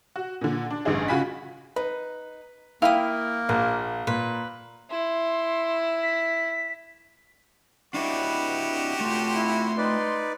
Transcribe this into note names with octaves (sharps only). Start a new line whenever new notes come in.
F#4
A#2 D3
D4
A1 G2 D3 D#4 G#4
C#3 F4 F#4 G#5 B5 B6
D#4 B4
A#3 E4 F5 G5 B5 D#6
A#1 F#5
A#2 B4
E4 C6
B6
D4 E4 F#4 G4 B4
A3 F4 C6
E4
D#4 B4 D5